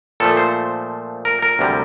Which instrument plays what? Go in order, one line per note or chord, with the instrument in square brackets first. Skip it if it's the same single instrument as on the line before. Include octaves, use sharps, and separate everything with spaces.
[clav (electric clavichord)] A#2 F3 A3 A4
C5
A#4
A#4
D2 C3 G3